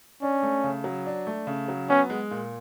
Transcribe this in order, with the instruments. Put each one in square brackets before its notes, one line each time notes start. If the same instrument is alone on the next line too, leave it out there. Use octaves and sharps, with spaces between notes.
[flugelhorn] C#4 [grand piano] D4
[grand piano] A3
C#3
F#3
D4
A3
C#3
F#3
[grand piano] B3 [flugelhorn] C#4
[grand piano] G#3
A#2